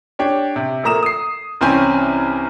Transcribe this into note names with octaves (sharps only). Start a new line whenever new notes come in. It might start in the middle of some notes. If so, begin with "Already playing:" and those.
D4 G4 C#5
C3
A#1 A3 A#3 A#5 D#6 E7
D#6 C7
C2 E3 C4 C#4 G#5 G6